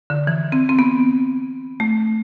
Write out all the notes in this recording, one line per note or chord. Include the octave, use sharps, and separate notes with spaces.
D3
E3
C4
C4
B3
A3